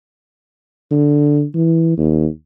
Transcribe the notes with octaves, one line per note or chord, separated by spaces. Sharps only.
D3
E3
D#2